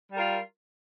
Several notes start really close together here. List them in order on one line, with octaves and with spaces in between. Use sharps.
G3 A#4 F4